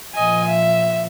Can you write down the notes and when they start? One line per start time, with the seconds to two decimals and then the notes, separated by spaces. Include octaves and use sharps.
0.15 A#2 F3 D#5 G#5
0.48 E5